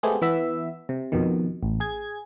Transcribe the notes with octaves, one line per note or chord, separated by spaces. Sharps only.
G#3 A3 B3 C4 G4 G#4
E3 B3 E5
C3
F2 B2 D#3
A1
G#4 G#6